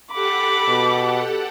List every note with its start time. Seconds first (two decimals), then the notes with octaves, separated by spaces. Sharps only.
0.12 G4 A4 F#5 B5 D6
0.68 B2